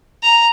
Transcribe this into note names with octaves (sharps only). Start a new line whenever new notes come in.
A#5